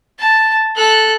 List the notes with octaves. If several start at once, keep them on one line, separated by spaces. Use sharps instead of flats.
A5
A4 F#6